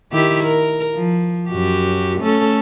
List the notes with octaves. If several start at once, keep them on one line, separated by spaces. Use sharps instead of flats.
D#3 E4 G4
A#4
F3
F#2 F#4 G4
A3 C#4 A4